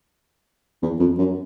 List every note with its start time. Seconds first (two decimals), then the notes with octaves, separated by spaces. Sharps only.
0.82 E2
1.00 F2
1.18 F#2